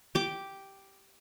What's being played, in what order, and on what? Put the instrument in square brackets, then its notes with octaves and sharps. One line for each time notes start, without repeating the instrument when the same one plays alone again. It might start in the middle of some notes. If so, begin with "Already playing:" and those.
[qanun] G4 D6